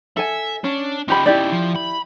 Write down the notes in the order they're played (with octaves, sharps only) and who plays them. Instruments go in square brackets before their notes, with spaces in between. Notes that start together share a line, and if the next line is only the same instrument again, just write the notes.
[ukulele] A4 G#5 [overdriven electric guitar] E5
[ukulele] C#4 [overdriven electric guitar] D4
[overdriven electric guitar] C#4 D#4 [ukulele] F4 G4 B5
[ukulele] E4 G4 D5
[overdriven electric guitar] F3
B5